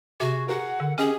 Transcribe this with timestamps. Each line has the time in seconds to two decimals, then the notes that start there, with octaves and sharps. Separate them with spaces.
0.20 C3 F#4 G#4
0.48 F#4 G#4 A#4 F#5
0.80 D3
0.98 C#4 G4 G#4 D#5 G#5